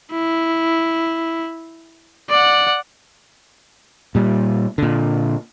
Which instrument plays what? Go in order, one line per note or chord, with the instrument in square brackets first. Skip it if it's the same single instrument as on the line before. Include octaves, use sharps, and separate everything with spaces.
[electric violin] E4
D5 F#5
[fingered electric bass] A#2 G3
A#2 D3